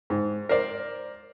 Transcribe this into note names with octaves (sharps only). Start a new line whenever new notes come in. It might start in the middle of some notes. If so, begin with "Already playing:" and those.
G#2
A#4 C5 D5